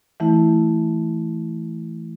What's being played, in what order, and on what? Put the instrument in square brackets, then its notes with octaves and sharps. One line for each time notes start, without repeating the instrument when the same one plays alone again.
[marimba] E3 A3 E4